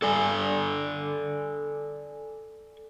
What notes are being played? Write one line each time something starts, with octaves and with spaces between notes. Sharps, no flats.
A4 D5 G#5